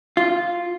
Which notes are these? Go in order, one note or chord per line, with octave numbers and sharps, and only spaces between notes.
F4